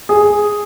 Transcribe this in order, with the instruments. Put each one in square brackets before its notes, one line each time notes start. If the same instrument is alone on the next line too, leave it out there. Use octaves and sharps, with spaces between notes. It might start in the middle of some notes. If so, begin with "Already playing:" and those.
[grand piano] G#4